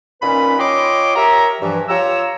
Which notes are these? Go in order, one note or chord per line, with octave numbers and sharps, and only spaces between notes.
A#2 D#3 C#4 B4 B5
F4 C#5 D#5 G5 C6 D6
G4 A#4 C#5 E5 A#5
G2 E3 F3
F4 G4 C#5 A#5 E6